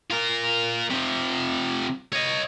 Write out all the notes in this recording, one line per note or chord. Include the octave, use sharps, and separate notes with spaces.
F4 A#4
C3 F3
C#5 D#5